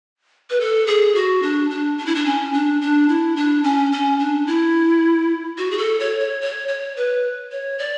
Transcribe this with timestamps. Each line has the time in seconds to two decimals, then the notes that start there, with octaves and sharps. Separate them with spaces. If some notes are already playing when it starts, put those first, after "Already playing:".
0.50 B4
0.60 A4
0.87 G#4
1.15 F#4
1.42 D4
1.70 D4
1.98 D4
2.06 E4
2.15 D4
2.26 C#4
2.53 D4
2.81 D4
3.09 E4
3.36 D4
3.64 C#4
3.92 C#4
4.19 D4
4.47 E4
5.58 F#4
5.71 G#4
5.78 A4
6.00 C#5
6.20 C#5
6.41 C#5
6.68 C#5
6.97 B4
7.52 C#5
7.79 D5